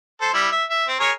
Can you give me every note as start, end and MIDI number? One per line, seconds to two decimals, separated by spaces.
0.21 0.30 69
0.21 0.30 72
0.34 0.48 55
0.34 0.48 64
0.52 0.64 76
0.70 0.86 76
0.88 0.98 60
1.00 1.12 68
1.00 1.12 70
1.00 1.12 73